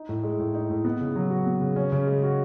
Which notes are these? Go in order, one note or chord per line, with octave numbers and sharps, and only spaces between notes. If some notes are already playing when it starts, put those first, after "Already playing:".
Already playing: D#4
A2
G#3
A2
D#4
A2
B3
C#3
F#3
F#4
B3
C#3
C#4
C#3
G#3
F#4